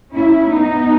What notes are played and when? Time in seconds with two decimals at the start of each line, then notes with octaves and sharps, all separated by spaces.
0.12 C#4 E4
0.50 B3 D#4